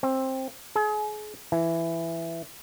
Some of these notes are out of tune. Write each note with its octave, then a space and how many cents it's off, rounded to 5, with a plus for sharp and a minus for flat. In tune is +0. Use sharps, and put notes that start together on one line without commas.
C4 +15
G#4 +35
E3 +10